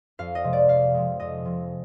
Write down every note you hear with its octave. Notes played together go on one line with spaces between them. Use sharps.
F2 F5
D#5
C3 F3 G#3
D5
F2 F5
C3 F3 G#3
F2 D#5
C3 F3 G#3